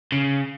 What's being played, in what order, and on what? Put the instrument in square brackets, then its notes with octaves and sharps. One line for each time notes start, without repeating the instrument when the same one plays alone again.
[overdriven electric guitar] C#3